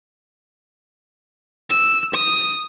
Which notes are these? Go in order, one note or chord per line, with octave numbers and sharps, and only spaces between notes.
E6
D#6